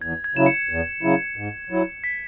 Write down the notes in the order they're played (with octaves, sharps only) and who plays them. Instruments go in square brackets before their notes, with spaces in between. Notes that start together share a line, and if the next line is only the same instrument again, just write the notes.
[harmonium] E2 [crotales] G#6
[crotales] G#6
[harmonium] C#3 F#3 E4 [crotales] E7
[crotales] C#7
[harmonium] E2
C#3 F#3 E4
G#2
F#3 E4
[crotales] B6